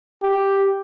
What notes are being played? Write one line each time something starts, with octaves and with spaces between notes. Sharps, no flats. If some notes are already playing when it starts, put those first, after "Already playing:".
G4